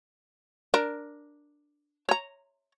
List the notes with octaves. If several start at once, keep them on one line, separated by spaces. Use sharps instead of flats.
D4 A#4
C#5 A#5